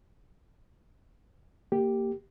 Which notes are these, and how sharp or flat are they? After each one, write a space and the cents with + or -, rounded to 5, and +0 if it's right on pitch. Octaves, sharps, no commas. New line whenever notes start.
A#3 -20 G4 +0